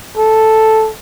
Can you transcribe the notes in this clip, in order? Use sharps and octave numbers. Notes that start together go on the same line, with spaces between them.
A4